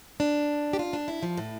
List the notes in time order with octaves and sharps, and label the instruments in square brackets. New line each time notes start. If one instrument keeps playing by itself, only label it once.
[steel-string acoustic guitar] D4
G4
F4
D4
E4
F3
A2